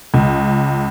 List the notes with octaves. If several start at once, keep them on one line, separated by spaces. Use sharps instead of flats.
C#2